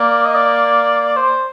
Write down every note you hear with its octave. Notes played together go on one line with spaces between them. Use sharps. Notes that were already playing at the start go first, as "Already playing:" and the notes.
Already playing: A#3 D5
D#5
D5
C5